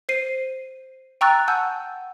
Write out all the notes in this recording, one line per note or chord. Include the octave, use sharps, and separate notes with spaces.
C5 C7 D#7
G5 A#5 C#6 E6 F#6 A6
F#5 G#5 A5 E6 G6